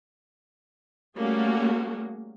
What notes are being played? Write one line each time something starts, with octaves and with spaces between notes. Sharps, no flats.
G3 A3 A#3 C#4 F#4 G#4